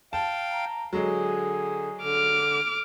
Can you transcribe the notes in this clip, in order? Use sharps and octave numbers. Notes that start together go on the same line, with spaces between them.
F5 G5 A5
A#5
D3 F#3 G#3 G#4
D3 D6 F6